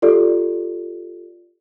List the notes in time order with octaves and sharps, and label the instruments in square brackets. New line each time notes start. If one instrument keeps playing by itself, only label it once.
[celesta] F4 G4 A4 D5